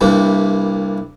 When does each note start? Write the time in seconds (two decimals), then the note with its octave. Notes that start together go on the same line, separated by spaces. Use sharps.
0.01 C2 G2 C3 A#3